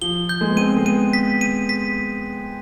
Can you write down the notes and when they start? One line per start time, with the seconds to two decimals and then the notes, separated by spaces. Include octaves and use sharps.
0.02 F3 G7
0.29 G6
0.41 G#3
0.49 B3
0.57 C4 D#7
0.76 G#3
0.85 B3 D#7
1.13 B6
1.41 D#7
1.69 B6